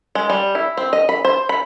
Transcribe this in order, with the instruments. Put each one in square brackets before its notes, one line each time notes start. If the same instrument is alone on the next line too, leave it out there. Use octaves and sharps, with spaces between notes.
[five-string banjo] G#3
G3
E4
C4
D#5
B5
C5
B5